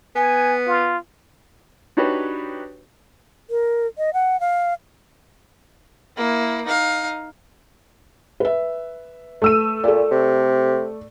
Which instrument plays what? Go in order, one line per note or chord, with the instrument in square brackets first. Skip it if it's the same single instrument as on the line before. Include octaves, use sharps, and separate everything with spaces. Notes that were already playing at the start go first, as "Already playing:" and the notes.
[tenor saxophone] B3 [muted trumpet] G#5
[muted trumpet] F4
[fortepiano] D4 D#4 F#4 G4 B4 C#5
[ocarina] A#4
D#5
F#5
F5
[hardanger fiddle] A#3 E4
D#4 F5
[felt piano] B4 E5
[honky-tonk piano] A3 E6 D#7
[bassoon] A#2 [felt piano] A4 D5
[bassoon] C3